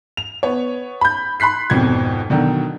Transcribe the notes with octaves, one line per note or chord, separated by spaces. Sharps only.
F7
B3 C#5
B5 G6
B5 C6 F#6 B6 C7
G#1 F2 B2 F3 G#6
B2 D3 D#3 F#3